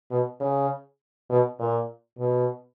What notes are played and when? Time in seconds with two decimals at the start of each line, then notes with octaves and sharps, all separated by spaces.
0.11 B2
0.40 C#3
1.30 B2
1.59 A#2
2.19 B2